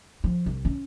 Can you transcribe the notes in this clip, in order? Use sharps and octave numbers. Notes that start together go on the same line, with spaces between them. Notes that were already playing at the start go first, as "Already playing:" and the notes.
F3
C2
C#4